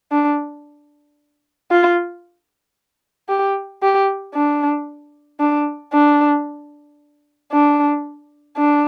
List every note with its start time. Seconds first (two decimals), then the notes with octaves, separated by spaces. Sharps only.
0.12 D4
1.71 F4
3.28 G4
3.82 G4
4.35 D4
5.40 D4
5.93 D4
7.52 D4
8.57 D4